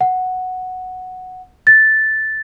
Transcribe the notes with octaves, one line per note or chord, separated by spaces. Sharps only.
F#5
A6